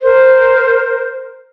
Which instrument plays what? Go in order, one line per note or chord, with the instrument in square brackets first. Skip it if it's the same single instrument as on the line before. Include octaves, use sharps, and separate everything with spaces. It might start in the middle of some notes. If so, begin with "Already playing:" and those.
[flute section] A#4 C5